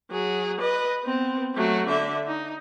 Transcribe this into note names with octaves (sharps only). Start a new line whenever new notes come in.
F#3 G#4
B4 D#5
B3 C4
F#3 A3
D3 E5
D#4